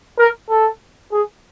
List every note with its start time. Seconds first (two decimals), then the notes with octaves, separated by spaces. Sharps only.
0.19 A#4
0.50 A4
1.12 G#4